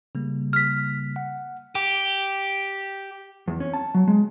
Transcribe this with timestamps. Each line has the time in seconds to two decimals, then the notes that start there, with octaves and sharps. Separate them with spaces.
0.15 C#3 G3 A#3
0.53 F6 B6
1.16 F#5
1.75 G4
3.48 E2
3.60 C#4
3.74 A5
3.94 F#3
4.08 G#3